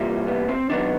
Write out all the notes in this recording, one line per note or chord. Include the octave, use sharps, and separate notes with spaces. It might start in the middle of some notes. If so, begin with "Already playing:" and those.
Already playing: C3 E3 G3 A#3 F4
B3
C4
C3 D#3 F#3 B3 D4